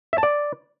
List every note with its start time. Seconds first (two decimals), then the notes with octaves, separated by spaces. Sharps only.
0.13 E5
0.18 A5
0.23 D5